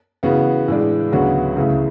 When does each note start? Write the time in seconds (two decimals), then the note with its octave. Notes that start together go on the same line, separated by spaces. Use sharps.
0.23 C#3 E3 B3 F#4
0.68 A2 E3 G#3 D4
1.12 D2 C#3 F#3 B3 F#4
1.56 C#2 C#3 E3 A3